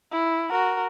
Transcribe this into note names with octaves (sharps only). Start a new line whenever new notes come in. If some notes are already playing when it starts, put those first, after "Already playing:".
E4
F#4 A#4